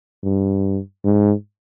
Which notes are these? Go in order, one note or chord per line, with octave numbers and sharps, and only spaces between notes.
G2
G#2